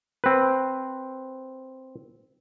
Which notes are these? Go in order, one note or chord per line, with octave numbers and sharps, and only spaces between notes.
C4 B4